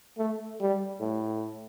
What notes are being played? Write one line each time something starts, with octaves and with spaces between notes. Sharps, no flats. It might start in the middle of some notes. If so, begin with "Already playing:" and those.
A3
G3
A2